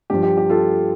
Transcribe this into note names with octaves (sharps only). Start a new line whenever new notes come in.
G2 F3 G4
G4
G4
F4 A4